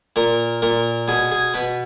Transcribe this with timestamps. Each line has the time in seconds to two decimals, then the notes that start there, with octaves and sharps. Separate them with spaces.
0.16 A#2 A#4
0.62 A#2 A#4
1.08 B2 G#4
1.31 G#4
1.54 B2 B4